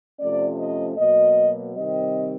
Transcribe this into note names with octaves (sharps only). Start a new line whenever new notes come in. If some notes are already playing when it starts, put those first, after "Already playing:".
C3 F3 A3 C#4 D5
D#5
B2 F#3 A#3 D#5
C3 D#3 G3 C4 D#5